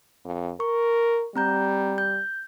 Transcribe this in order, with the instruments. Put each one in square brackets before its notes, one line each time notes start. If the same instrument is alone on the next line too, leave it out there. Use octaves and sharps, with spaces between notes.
[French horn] F2
[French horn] A#4 [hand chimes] C#6
[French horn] G3 [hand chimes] C4 A#5 G6
[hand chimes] G6